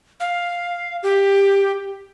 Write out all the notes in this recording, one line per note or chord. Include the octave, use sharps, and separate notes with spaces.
F5
G4